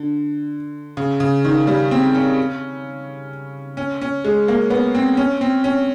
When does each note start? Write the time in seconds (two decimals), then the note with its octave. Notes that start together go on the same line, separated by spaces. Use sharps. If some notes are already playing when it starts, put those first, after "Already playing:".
Already playing: D3
0.97 C#3
1.20 C#3
1.45 D#3
1.67 G3
1.91 C4
2.14 C#4
3.77 C#4
4.01 C#4
4.25 G#3
4.48 A#3
4.70 B3
4.95 C4
5.17 C#4
5.41 C4
5.64 C#4